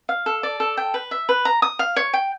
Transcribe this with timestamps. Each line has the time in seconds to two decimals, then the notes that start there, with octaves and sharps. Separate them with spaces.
0.09 F5
0.26 A4
0.43 D5
0.60 A4
0.77 G5
0.94 B4
1.11 E5
1.29 B4
1.45 A#5
1.62 D#6
1.79 F5
1.96 C#5
2.14 G5